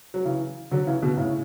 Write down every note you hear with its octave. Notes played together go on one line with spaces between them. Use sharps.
F#3
C#3 E3
D3 F#3
C#3 E3
B2 D3
A2 C#3